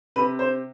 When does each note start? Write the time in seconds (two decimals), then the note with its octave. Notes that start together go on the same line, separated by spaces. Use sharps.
0.16 C3 B4
0.39 C5